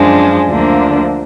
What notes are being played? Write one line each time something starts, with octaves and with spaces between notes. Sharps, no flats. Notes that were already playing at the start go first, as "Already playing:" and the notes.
Already playing: F#2 F3 G#3 D4
D2 D3 F3 A#3 D4